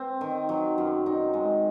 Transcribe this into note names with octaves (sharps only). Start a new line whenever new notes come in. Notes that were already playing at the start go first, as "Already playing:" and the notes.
Already playing: C4
D#3
F#3
F#2
D#4
G#3